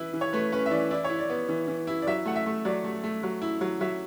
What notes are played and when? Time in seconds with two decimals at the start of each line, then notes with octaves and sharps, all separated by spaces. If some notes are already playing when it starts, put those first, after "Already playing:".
Already playing: E3 E4 B4
0.14 E3
0.21 C#5
0.33 A3 B4
0.52 C#4 B4
0.66 E5
0.71 E3 D5
0.91 E4 D5
1.04 C#5
1.10 E4
1.19 D5
1.30 B3
1.49 E3
1.68 E3
1.87 E4
2.02 D5
2.07 F#3 E5
2.26 A3 F#5
2.36 E5
2.46 A3
2.65 F#3 D5
2.84 A3
3.04 A3
3.23 F#3
3.42 E4
3.61 F#3
3.81 F#3 E5